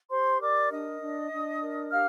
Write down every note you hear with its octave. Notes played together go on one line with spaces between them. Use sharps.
G4 C5 C6
A#4 D5 D6
D4 D#5 D#6
D4
D4
A#4
G4 F5 F6